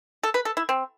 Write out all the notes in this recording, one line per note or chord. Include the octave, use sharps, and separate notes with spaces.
A4
B4
A4
E4
C4